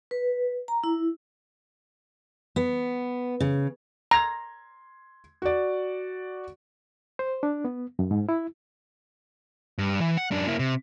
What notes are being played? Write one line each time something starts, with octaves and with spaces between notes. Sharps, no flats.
B4
A#5
E4
B3
C#3
A#5 C6 G#6
F#4 D5
C5
D4
B3
F#2
G#2
E4
G2
E3
F#5
F#2 D4
A#3 E4
C3